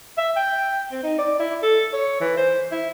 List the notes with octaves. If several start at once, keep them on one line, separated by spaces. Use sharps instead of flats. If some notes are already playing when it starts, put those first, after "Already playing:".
E5
G5
C4
D#4
D5
E4
A4
C#5
E3
C5
E4